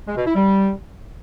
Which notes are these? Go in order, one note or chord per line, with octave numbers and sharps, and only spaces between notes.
G#3
B2
E4
G3